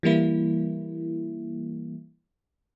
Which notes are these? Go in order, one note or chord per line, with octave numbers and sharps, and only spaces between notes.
E3 G3 A#3 E4